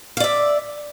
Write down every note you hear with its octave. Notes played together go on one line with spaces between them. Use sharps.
D5 E5 F5